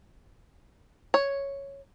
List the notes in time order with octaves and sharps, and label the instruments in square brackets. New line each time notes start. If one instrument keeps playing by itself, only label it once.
[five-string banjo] C#5